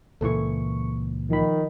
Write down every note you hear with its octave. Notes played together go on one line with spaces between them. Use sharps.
C#2 A#2 E3 A4 C#6
D#3 F3 B5